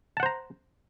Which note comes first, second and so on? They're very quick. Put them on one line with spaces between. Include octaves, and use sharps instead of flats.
A5 F#5 C5 A#5